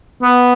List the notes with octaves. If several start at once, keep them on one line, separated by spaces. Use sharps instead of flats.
B3